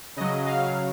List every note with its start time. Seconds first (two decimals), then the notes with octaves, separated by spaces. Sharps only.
0.16 C#3 F#3 D#5
0.46 F5